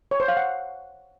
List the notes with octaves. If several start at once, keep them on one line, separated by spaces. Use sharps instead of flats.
C#5
C5
F5
F#5